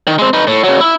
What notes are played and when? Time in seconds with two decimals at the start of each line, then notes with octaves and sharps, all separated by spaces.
0.07 D#3
0.19 G#3 C4
0.33 D#4 B4
0.47 A2
0.64 C#3 F#3
0.81 E4 E5